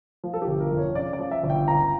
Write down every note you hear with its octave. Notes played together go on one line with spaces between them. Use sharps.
F3
A4
G4
G1
A#4
F2
C#5
C#3 D5
D5
F3
E5
G1
G5
C#2 A#5